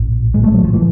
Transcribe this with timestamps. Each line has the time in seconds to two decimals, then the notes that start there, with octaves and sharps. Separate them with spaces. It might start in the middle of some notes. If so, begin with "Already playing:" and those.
Already playing: A#1 A2
0.34 G#3
0.44 A3
0.54 F#3
0.64 F3
0.74 E3